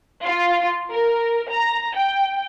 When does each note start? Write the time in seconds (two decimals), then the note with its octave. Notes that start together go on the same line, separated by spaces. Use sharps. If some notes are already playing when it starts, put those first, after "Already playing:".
0.24 F4
0.91 A#4
1.49 A#5
1.96 G5